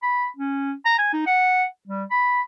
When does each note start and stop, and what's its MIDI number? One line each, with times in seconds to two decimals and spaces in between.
0.02 0.26 83
0.37 0.73 61
0.85 0.98 82
0.98 1.11 80
1.13 1.24 63
1.26 1.64 78
1.88 2.04 55
2.11 2.41 83